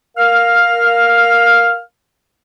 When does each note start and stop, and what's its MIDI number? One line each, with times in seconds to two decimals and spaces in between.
0.17 1.79 70
0.17 1.79 77
0.17 1.79 89